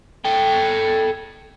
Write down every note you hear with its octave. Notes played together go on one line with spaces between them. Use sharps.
A4 G5